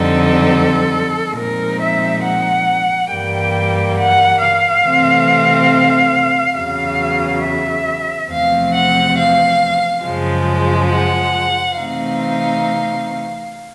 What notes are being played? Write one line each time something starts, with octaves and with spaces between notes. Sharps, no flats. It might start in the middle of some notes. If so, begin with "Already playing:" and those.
Already playing: F2 D3 G3 C4 D#4 A4
A#2 F3 G#3 C4 D#4 A#4
E5
F#5
G2 E3 G3 A#3 G5
F#5
F5
C3 E3 A3 C4
E2 C#3 F#3 F5
E5
E2 C3 F3 A3 C4 F5
F#5
F5
F#2 C#3 F3 G#3
F#5
C3 E3 A3 C4 D#4 F5